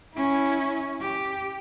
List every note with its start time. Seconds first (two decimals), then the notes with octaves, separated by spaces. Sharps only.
0.14 C#4 E4
1.01 G4